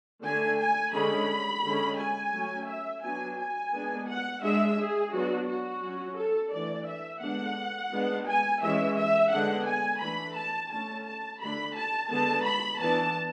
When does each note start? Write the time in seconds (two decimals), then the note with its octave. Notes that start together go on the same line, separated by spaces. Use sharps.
0.24 D3 A3 D4 G#5
0.59 G#5
0.94 D3 G#3 C#4 B5
1.64 D3 G#3 C#4
1.99 G#5
2.34 F#3 A3 C#4
2.69 E5
3.03 F#3 B3 D4 G#5
3.39 G#5
3.73 G#3 B3 D4
4.09 F#5
4.43 G#3 D4 E5
4.79 G#4
5.13 F#3 B3 D4 F#4
5.48 F#4
5.83 F#3 C#4
6.18 A4
6.53 E3 A3 D4 D5
6.87 E5
7.22 D3 G#3 B3 D4 F#5
7.92 G#3 B3 D4
8.27 G#5
8.62 E3 G#3 C#4 E5
8.97 E5
9.32 D3 G#3 B3 D4 F#5
9.67 G#5
10.01 E3 A3 D4 B5
10.37 A5
10.71 D3 A3 C#4 A5
11.06 A5
11.41 D3 A3 D4 B5
11.76 A5
12.11 D3 G#3 B3 A5
12.45 B5
12.81 E3 B3 D4 A5